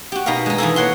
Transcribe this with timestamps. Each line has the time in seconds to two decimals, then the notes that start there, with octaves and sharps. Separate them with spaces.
0.12 F#4 G4
0.26 B2 D#4 A#4 B4 F5
0.46 G#3 D#4
0.58 E3 F4 G#4 A4
0.76 A#3 C#5 F#5 C6